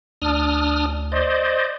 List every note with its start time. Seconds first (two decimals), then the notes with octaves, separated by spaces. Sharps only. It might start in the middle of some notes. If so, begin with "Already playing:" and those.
0.22 D2 D4 D#6 F6
1.12 C5 D5 D#5